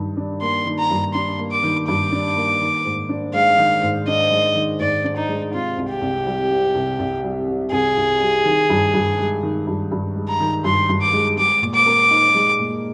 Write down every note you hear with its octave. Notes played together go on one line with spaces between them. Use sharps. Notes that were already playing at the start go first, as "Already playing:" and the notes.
Already playing: G2 D#3
D4
A#3 C6
D#3
A#5
G2
D4 C6
A#3
D6
D#3
G2 D6
D4
A#3
D#3
G#2
D4
G#3 F5
D#3
G#2
D4 D#5
G#3
D#3
G#2 D5
D4
D#4
G#3
C3 F4
C2
G4
C2
G3
C3
C2
C2
G3
C3
C2 G#4
C2
G3
D#3
G2
G2
G#3
D#3
G2
G2
G#3
A#5
D#3
G2 C6
G2
D6
G#3
G#3 D6
A#2
D6
A#4
D#4
G#3
A#2